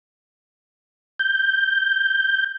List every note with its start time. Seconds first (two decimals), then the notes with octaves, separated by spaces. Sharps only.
1.19 G6